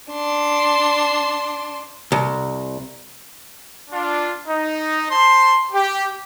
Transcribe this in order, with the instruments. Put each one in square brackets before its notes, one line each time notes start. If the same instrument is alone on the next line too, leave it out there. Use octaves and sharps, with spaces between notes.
[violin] D4 C6
[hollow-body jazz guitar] C2
[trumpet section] D4 F4
D#4
C5 A5 C6
G4